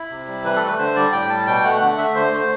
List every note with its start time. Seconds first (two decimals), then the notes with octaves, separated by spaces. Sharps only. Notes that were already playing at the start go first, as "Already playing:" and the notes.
Already playing: E4
0.10 C3
0.28 G3
0.44 E3 B4
0.56 A4
0.61 A3
0.67 B4
0.78 D3 C5
0.96 G3 D5
1.12 A2 G5
1.30 G3 A5
1.47 B2 G5
1.64 A3 F#5
1.81 D3 F#5
1.98 A3 E5
2.15 D3 C5
2.32 A3 C5